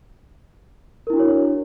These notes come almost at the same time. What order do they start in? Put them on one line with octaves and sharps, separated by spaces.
A#4 E4 D4 F#4 C#5